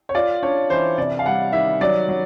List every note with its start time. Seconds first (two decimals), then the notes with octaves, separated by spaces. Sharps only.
0.09 C#5
0.15 F4 D5
0.43 D4 C#5
0.70 E3 C5
0.98 C3 D5
1.19 F5
1.26 G3 F#5
1.53 D#3 E5
1.81 F#3 D5
2.09 F#3